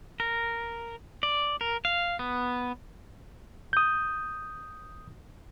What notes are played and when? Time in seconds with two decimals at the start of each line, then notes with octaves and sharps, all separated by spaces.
0.20 A#4
1.23 D5
1.61 A#4
1.85 F5
2.19 B3
3.73 D#6 G6